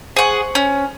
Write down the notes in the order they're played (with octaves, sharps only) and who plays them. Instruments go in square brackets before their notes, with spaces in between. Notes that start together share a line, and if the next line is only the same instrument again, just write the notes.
[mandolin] G#4 F#5 [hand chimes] C5 C#6
[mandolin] C#4